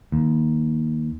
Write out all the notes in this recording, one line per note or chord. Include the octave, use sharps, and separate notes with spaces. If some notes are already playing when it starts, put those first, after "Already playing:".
D#2